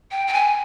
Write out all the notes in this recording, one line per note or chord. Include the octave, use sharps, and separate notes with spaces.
G5
G5
G#5